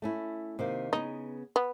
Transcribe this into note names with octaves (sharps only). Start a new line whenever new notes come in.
A3 C#4 E4
C3 D#3 A#3
C#3 B3 D#4
B3